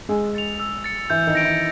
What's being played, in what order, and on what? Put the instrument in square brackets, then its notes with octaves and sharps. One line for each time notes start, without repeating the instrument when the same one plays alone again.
[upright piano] G#3 G#4 [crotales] E6
[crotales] A6 C#7 F7
E6
A6 C#7
[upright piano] E3 E4 [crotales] G6
[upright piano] D#3 D#4
[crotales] A#6 D7
[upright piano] E3 E4